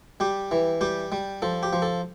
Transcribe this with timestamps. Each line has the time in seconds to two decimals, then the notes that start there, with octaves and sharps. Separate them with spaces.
0.20 G3 G4
0.51 E3
0.81 G3 G4
1.12 G3
1.42 F3 A4
1.63 G4
1.73 F3
1.82 A4